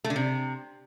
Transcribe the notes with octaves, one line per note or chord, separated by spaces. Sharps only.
A3
D3
C3